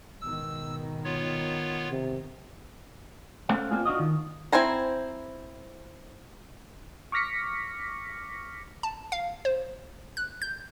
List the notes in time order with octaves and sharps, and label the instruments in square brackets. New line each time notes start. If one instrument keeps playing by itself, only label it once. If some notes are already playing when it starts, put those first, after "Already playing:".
[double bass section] G#2 B2 D#3 [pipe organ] E6
[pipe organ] B3 F4 C#5
[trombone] C3
[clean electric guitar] A3 C#4 A4 C5 F5 F#5
A#3 C4 D4 F4 G#4
D4 F4 F#4 D#5
D#3
[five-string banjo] C4 E4 C5 G#5 A#5
[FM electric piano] C#6 D6 F6 A#6 B6 C#7
[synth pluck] A5
F5
C5
F#6
G6